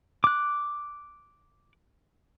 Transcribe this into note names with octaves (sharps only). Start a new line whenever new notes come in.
D6 F#6